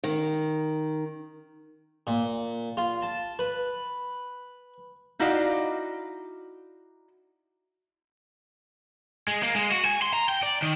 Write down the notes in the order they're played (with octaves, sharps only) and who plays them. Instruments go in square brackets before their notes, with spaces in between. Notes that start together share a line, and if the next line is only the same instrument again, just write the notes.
[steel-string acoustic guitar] D#3
[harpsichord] A#2
F4
A5
B4
[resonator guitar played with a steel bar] D#4 E4 F#4 D5 D#5 F5
[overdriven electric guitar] G#3
A#3
G#3
F#4
G#5
C6
A#5
G5
D5
D#3